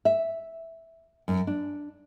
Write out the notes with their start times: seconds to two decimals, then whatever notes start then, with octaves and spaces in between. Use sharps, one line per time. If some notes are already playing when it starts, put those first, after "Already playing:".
0.05 E5
1.28 F#2
1.47 D4